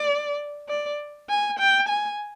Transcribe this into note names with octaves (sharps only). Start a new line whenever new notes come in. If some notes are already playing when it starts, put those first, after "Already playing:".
Already playing: D5
D5
G#5
G5
G#5